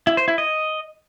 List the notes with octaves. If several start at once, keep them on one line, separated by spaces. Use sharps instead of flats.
E4
C5
E4
D#5